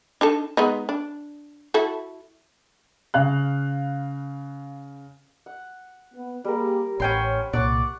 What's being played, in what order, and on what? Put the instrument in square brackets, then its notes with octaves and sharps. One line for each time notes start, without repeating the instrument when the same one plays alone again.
[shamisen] D4 D#4 A4
G#3 B3 D#4
D4
E4 F#4 A4
[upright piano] C#3 F5 F#6
[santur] F#5
[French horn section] B3
[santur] G3 A#4 [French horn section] A#3 G4 G#4
[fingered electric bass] A1 [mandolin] C#4 G5 C6 [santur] C5 F#5 B5 [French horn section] C#5
[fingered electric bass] C2 A#2 [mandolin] D5 [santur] F#5 C#6 D6